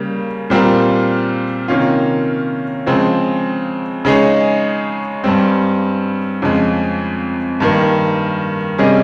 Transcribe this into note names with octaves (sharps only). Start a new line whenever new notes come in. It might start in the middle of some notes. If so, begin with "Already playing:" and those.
Already playing: C#3 G3 A#3
A#2 G3 C4 F4 A#4
C3 D#3 A#3 C#4 F4
C#3 F3 G#3 C4
C#3 G#3 D#4 G#4 C#5
G2 G3 C4
F2 C#3 F3 G#3
G2 D#3 A#3
C3 G3 C#4 G#4 D#5